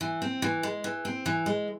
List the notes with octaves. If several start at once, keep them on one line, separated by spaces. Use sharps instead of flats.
E3
C4
E3
G#3
E3
C4
E3
G#3